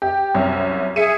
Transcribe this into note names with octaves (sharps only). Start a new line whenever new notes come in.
G4
C2 F#2 C#5
G#4 E5 C#7 D#7